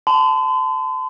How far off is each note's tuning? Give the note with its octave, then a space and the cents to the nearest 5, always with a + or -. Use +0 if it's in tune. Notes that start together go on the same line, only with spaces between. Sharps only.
A5 +0 C6 -45